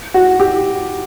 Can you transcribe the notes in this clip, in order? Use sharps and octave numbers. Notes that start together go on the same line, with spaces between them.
F#4
G4